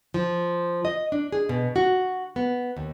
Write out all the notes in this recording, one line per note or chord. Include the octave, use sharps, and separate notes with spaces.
F3
D#5
D4
G#4
B2
F#4
B3
D#2